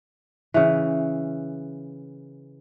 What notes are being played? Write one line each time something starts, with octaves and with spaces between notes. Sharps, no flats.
C#3 E3